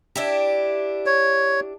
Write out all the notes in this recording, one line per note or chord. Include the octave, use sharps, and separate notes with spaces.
D4 E4 G4
C#5